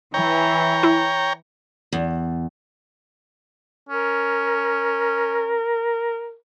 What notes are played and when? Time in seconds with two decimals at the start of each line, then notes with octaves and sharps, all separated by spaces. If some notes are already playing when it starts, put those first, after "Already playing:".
0.14 E3 C#5 G5 A#5
0.83 E4
1.92 E2
3.89 C#4 A#4